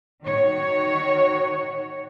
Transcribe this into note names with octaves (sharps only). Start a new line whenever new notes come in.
D#3 F#4 C#5